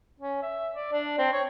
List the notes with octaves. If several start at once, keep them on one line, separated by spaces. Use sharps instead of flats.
C#4
E5
D5
D4
C4
C#5